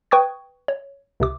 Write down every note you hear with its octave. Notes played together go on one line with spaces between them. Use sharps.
B4 G5 C#6 D#6 G#6
C#5
C#2 C3 D6